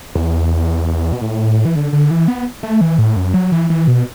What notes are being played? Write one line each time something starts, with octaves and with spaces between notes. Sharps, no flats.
E2
B2
A2
E3
D3
D3
E3
B3
A3
E3
A2
F#2
F#3
E3
E3
B2